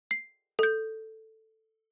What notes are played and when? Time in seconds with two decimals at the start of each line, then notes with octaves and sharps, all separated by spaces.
0.11 C7
0.59 A4 G6